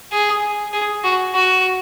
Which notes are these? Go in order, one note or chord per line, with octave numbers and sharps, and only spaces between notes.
G#4
G#4
F#4
F#4